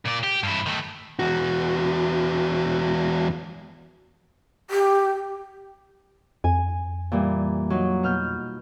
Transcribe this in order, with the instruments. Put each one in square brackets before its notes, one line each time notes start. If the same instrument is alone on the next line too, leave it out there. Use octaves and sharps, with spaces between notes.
[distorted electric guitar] A#2 D5
G4
G2 E4
D#3 A3
[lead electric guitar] E2 F#4
[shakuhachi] G4
[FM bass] F2 [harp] G#5
[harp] A#2 E3 G3
F#3 D#4
B2 F6 G6